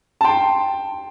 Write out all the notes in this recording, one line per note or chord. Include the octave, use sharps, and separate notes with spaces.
A5
G5 C6